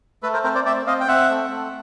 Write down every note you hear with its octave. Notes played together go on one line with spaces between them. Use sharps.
A3 A4 B4
A#4 C5
C4 A#4 C5
C5 D5
C4 D5 E5
C4 D#5 F5
G5
C4 E5 F#5
A3
A3